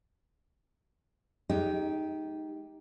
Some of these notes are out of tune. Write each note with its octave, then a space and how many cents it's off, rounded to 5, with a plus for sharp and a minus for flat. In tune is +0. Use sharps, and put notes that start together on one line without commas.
G#3 +30 D#4 +0 G4 +0